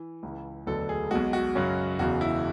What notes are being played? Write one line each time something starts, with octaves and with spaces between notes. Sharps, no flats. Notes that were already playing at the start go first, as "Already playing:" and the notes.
Already playing: E3
C#2 C#3 E3
E1 D2 D3 F#3 B3 A4
G#4
B1 B2 G#3 F#4
F#4
F#2 C#3 F#3 C#4
E1 E2 C#3 F#4
E4